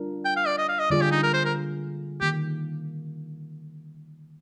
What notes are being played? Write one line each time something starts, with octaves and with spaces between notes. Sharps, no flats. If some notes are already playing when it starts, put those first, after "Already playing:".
Already playing: G3 D4 F4 A#4
G5
F5
D5
D#5
F5
D#5
D3 G3 A#3 F4 G#4 D5
G4
D#4
A#4
C5
A#4
D#3 A#3 G4